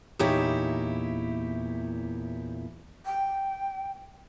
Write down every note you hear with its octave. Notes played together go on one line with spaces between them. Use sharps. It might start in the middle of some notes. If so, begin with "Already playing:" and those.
E2 A#2 D#4 E4 G4 C#5
G5